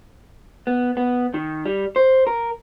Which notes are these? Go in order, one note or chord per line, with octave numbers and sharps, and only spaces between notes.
B3
B3
D#3
G3
C5
A#4